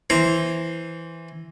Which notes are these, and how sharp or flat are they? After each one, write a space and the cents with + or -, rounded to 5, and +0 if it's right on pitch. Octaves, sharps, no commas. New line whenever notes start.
E3 +0 C5 +0 A#5 +0